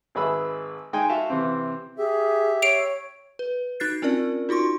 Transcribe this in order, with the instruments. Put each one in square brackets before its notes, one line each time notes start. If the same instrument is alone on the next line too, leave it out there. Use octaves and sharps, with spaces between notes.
[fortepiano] G#1 G#4 B4 E5 B5 E6
G#3 D#4 G5 G#5
F#4 E5 F5 A5
C3 E3 C4
[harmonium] G4 E5 [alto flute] G#4
[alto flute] C#5 [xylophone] C7 D7 F7
[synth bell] B4
D#4 F#4 F#6 A6 C7
C4 C#4 F4 A#4 D5
D#4 F4 F#4 C6 C#6